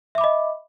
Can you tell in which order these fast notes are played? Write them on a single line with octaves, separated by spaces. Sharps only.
E5 D6 B5 D#5